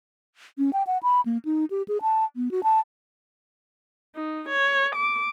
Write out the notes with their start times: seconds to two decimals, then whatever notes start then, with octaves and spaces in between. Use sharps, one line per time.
0.58 C#4
0.73 G5
0.87 F#5
1.03 B5
1.26 A#3
1.45 D#4
1.71 G4
1.88 G#4
2.02 A5
2.36 B3
2.51 F#4
2.63 A5
4.16 D#4
4.49 C#5
4.95 D6